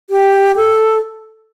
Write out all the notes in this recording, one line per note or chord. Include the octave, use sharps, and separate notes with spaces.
G4
A4